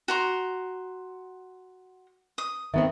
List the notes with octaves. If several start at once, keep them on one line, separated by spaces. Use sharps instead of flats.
F#4 A#5 C6
D#6
D#3 B3 C4 E5